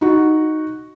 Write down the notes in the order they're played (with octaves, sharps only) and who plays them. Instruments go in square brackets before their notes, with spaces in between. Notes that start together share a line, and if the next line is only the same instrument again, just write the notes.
[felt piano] D#4 F#4